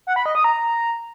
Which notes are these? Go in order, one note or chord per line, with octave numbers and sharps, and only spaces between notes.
F#5
B5
D#5
D#6
A#5